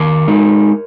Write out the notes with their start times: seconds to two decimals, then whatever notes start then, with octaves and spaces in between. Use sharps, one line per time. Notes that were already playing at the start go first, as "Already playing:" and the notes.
Already playing: D#3 A#4 C#5
0.27 G#3 D#4